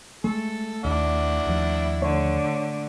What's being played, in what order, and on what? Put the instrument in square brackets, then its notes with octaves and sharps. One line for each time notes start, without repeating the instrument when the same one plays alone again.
[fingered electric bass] G#3 [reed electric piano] A3 [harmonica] A4
[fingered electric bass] D#2 [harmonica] D4 E4 F#5
[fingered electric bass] D#2 F3
[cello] D3 A3 [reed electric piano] C#5